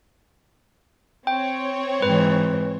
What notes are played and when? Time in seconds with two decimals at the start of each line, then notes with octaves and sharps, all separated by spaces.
1.27 C4 C#5 G5
2.02 G#2 E3 B4